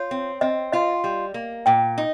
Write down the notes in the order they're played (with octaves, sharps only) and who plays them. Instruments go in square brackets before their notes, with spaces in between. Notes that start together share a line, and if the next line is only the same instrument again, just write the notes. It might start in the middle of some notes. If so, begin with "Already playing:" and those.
Already playing: [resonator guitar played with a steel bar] F4 [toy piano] C#5
[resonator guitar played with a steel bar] C4
[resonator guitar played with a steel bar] C4 [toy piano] D#5
[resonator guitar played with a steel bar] F4 [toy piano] D#5
[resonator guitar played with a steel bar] G3
A#3
[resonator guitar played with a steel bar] A#2 [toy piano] G5
[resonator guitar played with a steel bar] D#4